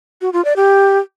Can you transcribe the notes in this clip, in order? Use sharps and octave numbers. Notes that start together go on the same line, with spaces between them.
F#4
F4
D5
G4